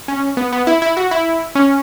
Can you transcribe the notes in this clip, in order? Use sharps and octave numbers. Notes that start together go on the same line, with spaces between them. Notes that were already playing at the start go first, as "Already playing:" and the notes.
C#4
B3
B3
E4
E4
F#4
E4
C#4